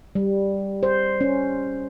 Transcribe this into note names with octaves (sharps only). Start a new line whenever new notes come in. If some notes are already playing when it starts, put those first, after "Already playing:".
G3
C5
C#4